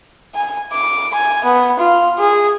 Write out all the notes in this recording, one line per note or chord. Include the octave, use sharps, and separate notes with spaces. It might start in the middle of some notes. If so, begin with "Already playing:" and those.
G#5
D6
G#5
B3
F4
G#4